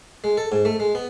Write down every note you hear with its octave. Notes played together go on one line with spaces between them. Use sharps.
G#3
A4
G#2
A3
G#3
B3